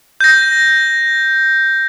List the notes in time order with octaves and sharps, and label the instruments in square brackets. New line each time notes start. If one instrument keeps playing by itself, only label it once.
[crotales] G6 A#6